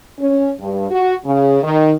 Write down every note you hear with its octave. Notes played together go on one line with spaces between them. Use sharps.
C#4
G2
F#4
C#3
D#3